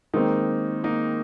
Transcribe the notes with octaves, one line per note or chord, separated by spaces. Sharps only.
D#3 G#3 A#3 C4 D#4
A#3 D#4